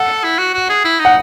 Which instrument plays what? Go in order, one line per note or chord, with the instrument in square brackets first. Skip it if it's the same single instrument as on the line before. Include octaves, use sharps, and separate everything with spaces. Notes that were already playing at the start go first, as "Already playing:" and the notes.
Already playing: [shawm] A4 [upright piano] F#5
[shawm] E4
F#4
F#4
G#4
E4
D#4
[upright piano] F#5